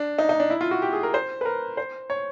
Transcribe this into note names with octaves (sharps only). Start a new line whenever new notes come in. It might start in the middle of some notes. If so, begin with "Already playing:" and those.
Already playing: D4
D#4
D#4
D4
E4
F4
F#4
G4
G#4
A#4
C5
B4
A#4
C5
C#5